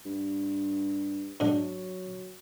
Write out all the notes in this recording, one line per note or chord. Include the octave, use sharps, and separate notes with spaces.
G2
G#2 F#3 D4